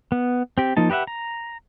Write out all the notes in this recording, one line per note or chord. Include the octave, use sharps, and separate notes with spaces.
B3
C4 G4
F3 A#3 D#4 A5
G4 B4 D#5 E5 F#5
A#5